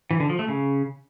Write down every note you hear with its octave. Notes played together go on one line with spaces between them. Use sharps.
E3
D3
F3
A3
C#3